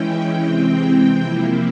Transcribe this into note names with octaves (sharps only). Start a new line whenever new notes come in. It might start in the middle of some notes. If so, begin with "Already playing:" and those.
Already playing: E3 G#3 C#4 E4 G5
C3 E3 G#3 C4
C3 F3 A#3 E4